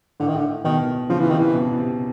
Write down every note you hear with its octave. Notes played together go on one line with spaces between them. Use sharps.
A2 D3
D#3
D3
B2 D#3
C#3 F3
E3
C3 D#3
E3
B2
C3